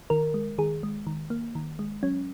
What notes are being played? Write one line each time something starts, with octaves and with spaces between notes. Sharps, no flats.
D#3 A#4
G#3
D#3 G#4
G#3
D#3
A#3
D#3
G#3
F#3 C#4